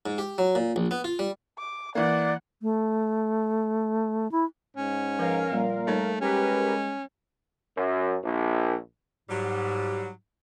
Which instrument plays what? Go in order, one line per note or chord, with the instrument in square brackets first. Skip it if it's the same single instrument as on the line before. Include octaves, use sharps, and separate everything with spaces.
[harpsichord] G#2
G4
F#3
A#2
A#1
B3
F4
G3
[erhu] D6
[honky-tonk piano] E3 A#3 [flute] D5 [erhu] F#5
[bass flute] A3
E4
[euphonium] G#2 [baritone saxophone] C#4
[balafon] F3 B4 [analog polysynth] A#4 F5
[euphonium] A#2 [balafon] G3 A#3
[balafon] G3 D#4 C#5 [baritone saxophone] A3
[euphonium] G#3 [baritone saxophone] C#4 [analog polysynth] G4 A#4 B4
[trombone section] F#2
A#1
[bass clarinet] G#2 [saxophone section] F#3 G3